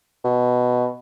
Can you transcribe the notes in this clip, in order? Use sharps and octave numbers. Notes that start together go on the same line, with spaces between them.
B2